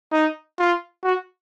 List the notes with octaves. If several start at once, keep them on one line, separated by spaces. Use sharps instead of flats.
D#4
F4
F#4